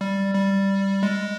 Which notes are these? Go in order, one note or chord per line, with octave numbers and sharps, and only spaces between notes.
G3
G3
G#3